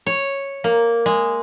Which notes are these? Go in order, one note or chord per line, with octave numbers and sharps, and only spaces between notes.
C#5
A#3
G#3